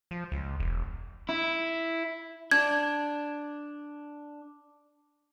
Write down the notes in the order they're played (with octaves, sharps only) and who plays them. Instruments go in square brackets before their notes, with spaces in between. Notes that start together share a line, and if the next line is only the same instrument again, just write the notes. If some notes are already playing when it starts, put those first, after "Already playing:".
[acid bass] F3
C#2
E1
[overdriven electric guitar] E4
[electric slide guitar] D4 [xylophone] G#6